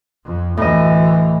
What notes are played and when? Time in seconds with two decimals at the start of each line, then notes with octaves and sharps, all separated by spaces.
0.24 F2
0.57 D2 A2 E3 D#5